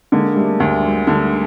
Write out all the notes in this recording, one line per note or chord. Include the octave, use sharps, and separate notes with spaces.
D3 G#3 A#3
G3 A3
D2 G3
F#3 G#3
D3 G3 A3